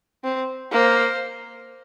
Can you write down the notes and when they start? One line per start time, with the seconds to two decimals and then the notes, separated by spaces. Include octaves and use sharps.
0.24 C4
0.72 A#3 C5